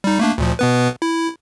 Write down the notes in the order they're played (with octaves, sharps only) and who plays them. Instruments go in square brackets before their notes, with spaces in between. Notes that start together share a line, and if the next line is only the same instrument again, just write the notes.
[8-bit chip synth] G3 D#4
A3 A#3 D4
D2 A#2 F3
B2 B3 B4
E4